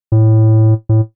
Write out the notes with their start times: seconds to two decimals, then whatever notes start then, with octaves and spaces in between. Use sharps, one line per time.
0.12 A2
0.89 A2